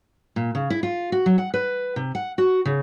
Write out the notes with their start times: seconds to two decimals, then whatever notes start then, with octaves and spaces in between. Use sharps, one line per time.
0.36 A#2
0.55 C#3
0.70 E4
0.83 F4
1.12 F#4
1.26 F#3
1.38 F#5
1.54 B4
1.96 C3
2.15 F#5
2.38 F#4
2.65 C#3